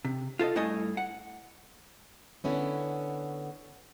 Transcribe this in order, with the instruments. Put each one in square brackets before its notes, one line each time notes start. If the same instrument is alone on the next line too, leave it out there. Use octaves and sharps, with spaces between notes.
[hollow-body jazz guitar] C3
F4 A4 C5 D#5
G2 A3 E4 A4 D#5 G#5
F#5
[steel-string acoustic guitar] D3 B3 C#4 E4